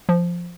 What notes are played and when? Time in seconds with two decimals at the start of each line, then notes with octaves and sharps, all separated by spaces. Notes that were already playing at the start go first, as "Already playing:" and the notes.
0.09 F3